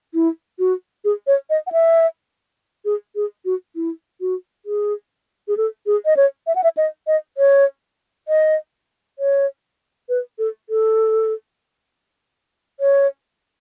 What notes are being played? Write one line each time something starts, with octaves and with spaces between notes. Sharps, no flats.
E4
F#4
G#4
C#5
D#5
F#5
E5
G#4
G#4
F#4
E4
F#4
G#4
G#4
A4
G#4
D#5
C#5
E5
F#5
E5
D#5
D#5
C#5
D#5
C#5
B4
A4
A4
C#5